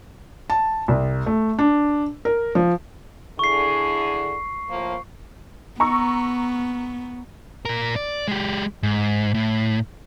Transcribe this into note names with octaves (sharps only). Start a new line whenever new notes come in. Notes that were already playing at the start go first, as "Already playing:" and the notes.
A5
C2
A3
D4
A#4
F3
D3 E4 G#4 C#6 C7
A2 F3 A#3
B3 A#5 C#6 E6
A#2 A#4
D5
G#3 G4
G#2
A2